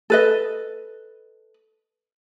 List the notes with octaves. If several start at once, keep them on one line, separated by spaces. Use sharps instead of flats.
A4 B4 D#5